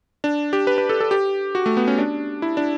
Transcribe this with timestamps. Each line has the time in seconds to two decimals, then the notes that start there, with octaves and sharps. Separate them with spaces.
0.24 D4
0.53 G4
0.67 B4
0.78 B4
0.89 A4
1.00 A4
1.11 G4
1.55 F#4
1.66 A3
1.77 B3
1.87 C#4
1.98 D4
2.42 E4
2.57 D4